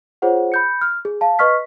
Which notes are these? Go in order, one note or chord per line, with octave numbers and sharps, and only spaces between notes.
F4 G#4 C5 C#5 F#5
B5 G6 C#7
F6
G#4
F5 A5
B4 D#5 C#6 F6 B6